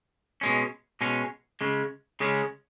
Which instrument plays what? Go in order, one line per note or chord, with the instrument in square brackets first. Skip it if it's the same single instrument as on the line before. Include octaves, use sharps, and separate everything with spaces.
[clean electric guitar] B2 G#3 C#4
B2 G#3 C#4
C#3 G#3 C#4
C#3 G#3 C#4